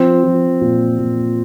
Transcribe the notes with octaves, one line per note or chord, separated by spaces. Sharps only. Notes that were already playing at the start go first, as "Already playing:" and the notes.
Already playing: F3 C4
F3
A#2
A#2